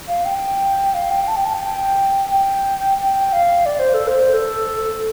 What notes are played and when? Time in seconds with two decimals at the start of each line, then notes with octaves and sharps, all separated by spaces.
0.08 F5
0.25 G5
0.94 F5
1.11 G5
1.28 A5
1.36 G5
1.45 A5
1.54 G5
2.31 G5
2.98 G5
3.33 F5
3.66 D5
3.79 C5
3.94 A4
4.08 C5
4.34 A4